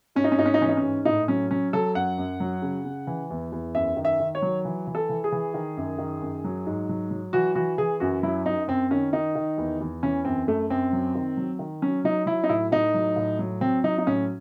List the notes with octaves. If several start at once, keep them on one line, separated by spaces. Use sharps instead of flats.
G#2 C#4
D#4
C#4
G#2 D#4
C#4
D#4
E3 C#4
D#4
C#4
G#2
A2 D#4
F#3 C#4
F#3 C#4
F#3 A4
F#2 F#5
F#2
F#3
C#3
C#3
E3
E2
E2
F#2 E5
D#3
E5
D#3
C#5
F#3
E3
E3
A4
E3
G#4
E3
D#3
F#2
D#3
F#2
F#3
G#2
F#3
F#3
E3 F#4
E3 F#4
E3 G#4
F#2 F#4
F#3 E4
F#2 D#4
F#2 C4
D#3 C#4
D#3 D#4
D#3
E2
E2
E3 C#4
F#2 C4
F#2 A3
F#2 C4
F#3
D#3
F#3
D#3
F#3 C#4
F#3 D#4
F#3 E4
D#4
A2 E4
A2 D#4
F#3
A2
F#3
F#3 C4
F#3 D#4
D#4
A2 C#4